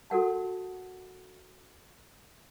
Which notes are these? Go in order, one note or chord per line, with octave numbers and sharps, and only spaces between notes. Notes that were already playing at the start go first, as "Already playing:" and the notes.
F#4 A4 A#4 F#5 A5